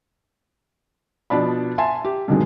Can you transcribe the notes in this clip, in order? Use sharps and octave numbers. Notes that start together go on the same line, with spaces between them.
B2 F3 D4 D5 B5
E5 G#5 A5 C6
G4
G2 B2 D3 D#3 F#3 G#3